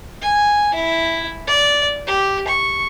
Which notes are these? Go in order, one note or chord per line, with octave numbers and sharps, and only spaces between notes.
G#5
E4
D5
G4
C#6